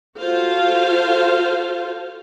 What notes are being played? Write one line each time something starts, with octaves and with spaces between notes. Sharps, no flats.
F4 F#4 A4 C5 F5